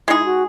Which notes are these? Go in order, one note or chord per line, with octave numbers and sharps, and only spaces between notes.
G#3 D#4 E4 G#4
E4
F#4